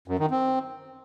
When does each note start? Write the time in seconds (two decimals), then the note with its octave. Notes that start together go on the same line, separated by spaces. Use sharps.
0.08 F#2
0.19 D#3
0.30 C4